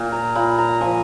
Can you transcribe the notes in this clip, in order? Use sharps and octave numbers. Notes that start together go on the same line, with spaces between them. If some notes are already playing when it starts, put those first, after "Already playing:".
Already playing: A#2
A#5
A#2 B5
A#5
F3 G#5